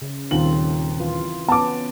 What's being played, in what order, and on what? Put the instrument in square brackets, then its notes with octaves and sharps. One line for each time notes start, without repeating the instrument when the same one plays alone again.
[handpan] C#3
[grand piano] D#1 D#2 F#7 [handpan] C4 F4
[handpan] E3 F4
[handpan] B3 C#4 [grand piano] A5 D6